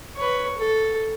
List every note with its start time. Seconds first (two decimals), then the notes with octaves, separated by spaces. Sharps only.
0.17 B4 C#5
0.57 A4